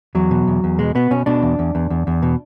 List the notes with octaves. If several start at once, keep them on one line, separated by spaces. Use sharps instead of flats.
E2 F#3
B2
E2
E2
B2 G#3
B2 B3
B2 C#4
B2 D4
E2
E2
E2
E2
E2
B2